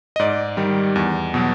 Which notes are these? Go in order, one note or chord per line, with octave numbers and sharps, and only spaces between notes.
D#5
G#2 D5
D#3 G3
E2
B2 F#3